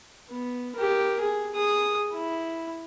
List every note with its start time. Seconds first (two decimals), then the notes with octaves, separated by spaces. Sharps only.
0.30 B3
0.75 G4 A#4
1.20 G#4
1.54 G#4 D#6
2.13 E4